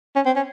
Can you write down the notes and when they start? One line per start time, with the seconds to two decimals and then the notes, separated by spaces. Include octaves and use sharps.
0.16 C#4
0.26 C4
0.36 C#4